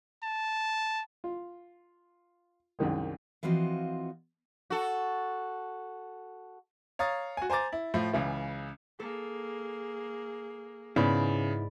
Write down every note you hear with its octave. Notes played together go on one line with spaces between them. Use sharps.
A5
F4
C2 F#2 D#3 G#3
E3 F3 C4 F4 F#4 D#5
F#4 A4
C#5 F5 A#5 D#6 A6
F#4 G#5
C5 G#5 A#5 D6 A6
E4
A2 F3
C#2 C#3 E3
A#3 G#4 A4
G#2 C#3 B3 E4 D5 B5